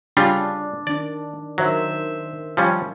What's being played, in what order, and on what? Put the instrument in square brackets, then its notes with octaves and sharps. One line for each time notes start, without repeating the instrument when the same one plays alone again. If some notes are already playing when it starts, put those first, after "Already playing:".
[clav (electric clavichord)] C#3 G3 F4 [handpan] D4
[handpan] D#3 D4 [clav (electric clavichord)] D5
[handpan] D#3 C5 E5 [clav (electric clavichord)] F#3
[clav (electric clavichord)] F3 G3 C#4